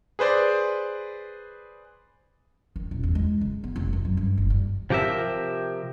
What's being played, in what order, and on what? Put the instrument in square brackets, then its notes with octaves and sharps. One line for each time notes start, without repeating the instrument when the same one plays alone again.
[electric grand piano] G#4 B4 C5 D5
[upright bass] D#3
D#1
E2
G#3
C#3
B3
F1
F#2
F#3
G2
F#1
G3
[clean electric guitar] C3 F3 G4 A#4 E5